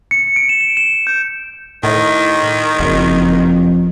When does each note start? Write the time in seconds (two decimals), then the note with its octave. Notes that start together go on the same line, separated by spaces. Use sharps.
0.11 C#7
0.36 D7
0.49 E7
0.61 E7
0.77 E7
1.07 G6
1.83 A2 D#3
2.79 F#1 F2